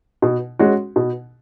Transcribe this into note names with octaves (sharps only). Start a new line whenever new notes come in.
B2
G#3 C#4 F#4
B2